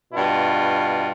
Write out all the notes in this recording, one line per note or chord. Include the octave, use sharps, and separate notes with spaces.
G2 B2 F4